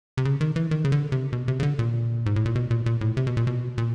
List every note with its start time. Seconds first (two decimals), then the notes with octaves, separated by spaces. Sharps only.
0.18 C3
0.25 C#3
0.41 D#3
0.56 E3
0.71 D#3
0.85 C#3
0.92 D3
1.12 C3
1.33 B2
1.48 C3
1.60 C#3
1.63 D3
1.79 A#2
2.26 G#2
2.36 A2
2.46 A#2
2.55 B2
2.71 A#2
2.86 A#2
3.01 A2
3.17 C3
3.27 B2
3.37 A#2
3.47 B2
3.78 A#2